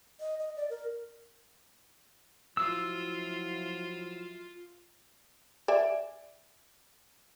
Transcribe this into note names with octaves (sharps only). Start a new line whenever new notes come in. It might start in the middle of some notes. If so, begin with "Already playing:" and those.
D#5
D#5
D5
A#4
F3 F#3 E4 F4 E6
D5 E5 G#5